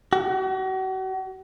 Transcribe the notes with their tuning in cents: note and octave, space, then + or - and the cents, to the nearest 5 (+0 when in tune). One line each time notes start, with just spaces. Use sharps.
F#4 +40